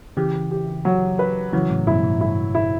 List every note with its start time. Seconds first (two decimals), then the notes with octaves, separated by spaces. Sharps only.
0.17 C#3 E3 G4
0.51 G4
0.85 F#3
1.19 B4
1.53 C#3 E3 F#3
1.70 A2 C#3
1.87 G2 B2 E4
2.04 A2
2.20 G2 E4
2.55 E4